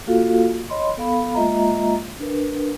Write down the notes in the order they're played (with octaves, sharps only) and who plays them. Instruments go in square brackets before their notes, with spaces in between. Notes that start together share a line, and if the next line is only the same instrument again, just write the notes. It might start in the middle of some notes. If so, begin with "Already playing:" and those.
[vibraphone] A#3 F4 F#4 A4 F5
C#5 D#5 B5 C6
B3 A4 F5 B5
G#3 A#3 F4 D#5 E5 A#5
D4 A#4 B4